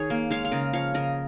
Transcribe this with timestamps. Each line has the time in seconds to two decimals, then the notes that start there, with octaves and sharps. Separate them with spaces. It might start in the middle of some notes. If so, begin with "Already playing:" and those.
Already playing: D#3 G#4 C#5
0.10 A#3
0.31 G#3 C#5 F5
0.45 F5
0.52 C#3 A#4 D#5
0.73 F3 C#5 F5
0.94 C#3 A#4 D#5